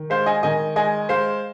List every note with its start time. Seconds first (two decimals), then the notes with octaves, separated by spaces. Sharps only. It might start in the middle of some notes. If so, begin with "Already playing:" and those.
Already playing: D#3
0.10 G#3 C5 F5
0.26 D#5 G#5
0.43 D#3 D#5 G#5
0.76 G#3 D#5 G#5
1.09 G#3 C5 F5